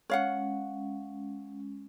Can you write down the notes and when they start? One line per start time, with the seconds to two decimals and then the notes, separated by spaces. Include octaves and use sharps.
0.10 G#3 C#4 C#5 F5 F#5